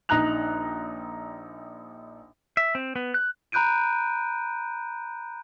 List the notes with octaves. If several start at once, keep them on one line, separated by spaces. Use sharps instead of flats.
A#1 D#4 A#5 F#6 F7
E5
C4
B3
F#6
A#5 B5 F#6 G6 D7 D#7